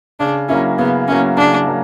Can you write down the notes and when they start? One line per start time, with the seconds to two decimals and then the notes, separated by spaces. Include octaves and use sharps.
0.20 C#3 D4
0.49 F#3 A#3 C#4 E4
0.78 C#3 B3
1.08 F#3 A#3 C#4 E4
1.37 C#3 D4
1.67 F#3 A#3